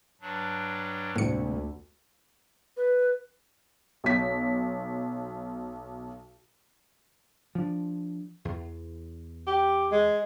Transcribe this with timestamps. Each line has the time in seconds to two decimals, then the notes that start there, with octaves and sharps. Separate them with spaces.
0.21 G2 F#3 D4
1.16 D2 A2 C3 G#3 A#3 C#7
2.77 B4
4.04 B1 B6
7.55 F3 D4
8.45 E2
9.47 G4
9.92 G#3